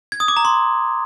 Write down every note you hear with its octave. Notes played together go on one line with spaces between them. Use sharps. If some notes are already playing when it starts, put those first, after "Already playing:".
G#6
D#6
D6
A#5
C6